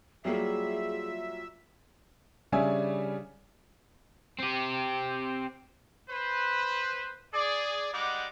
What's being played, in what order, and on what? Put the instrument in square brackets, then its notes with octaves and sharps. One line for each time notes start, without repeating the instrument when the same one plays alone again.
[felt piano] F#3 G3 A#3 [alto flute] F4 [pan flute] G#4 [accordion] E5
[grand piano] C#3 G3 D4 C#5 E5 G#5
[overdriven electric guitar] C4 G4
[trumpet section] B4 C5
G#4 D5
G3 G#3 D#4 F#5 D6